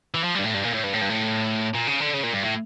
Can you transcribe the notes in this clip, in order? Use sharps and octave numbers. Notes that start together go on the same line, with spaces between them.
E3
F3
G3
G2
A2
G2
A#2
A2
G2
A2
G2
A2
A#2
C#3
D3
C#3
A#2
G2
A2